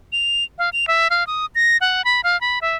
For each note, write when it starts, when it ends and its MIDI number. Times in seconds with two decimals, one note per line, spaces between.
0.12 0.44 101
0.58 0.69 77
0.73 0.85 101
0.88 1.08 76
1.10 1.26 77
1.27 1.46 87
1.55 1.77 94
1.81 2.04 78
2.04 2.21 83
2.24 2.39 77
2.41 2.59 83
2.62 2.76 76